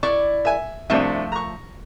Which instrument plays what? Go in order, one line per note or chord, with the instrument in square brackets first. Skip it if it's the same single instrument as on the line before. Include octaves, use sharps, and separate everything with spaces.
[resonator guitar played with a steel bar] E4 D5 [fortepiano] C#6
[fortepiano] E5 G#5
[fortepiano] C2 C3 D4 [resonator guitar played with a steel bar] F3 A3 E5
[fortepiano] A#5 C#6